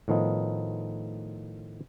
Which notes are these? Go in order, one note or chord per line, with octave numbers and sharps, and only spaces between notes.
A2 D#3 F3 B3 D#4